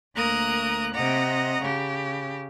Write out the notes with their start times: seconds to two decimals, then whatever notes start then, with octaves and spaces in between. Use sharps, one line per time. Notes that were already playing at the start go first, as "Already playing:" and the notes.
0.15 D2 A#3 A#4 A#5 D#6 F#6
0.94 C3 D#5 F#5 A#5
1.61 C#3 G4